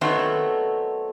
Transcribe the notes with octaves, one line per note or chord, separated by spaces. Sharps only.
D#3 F#3 A3 B3 C4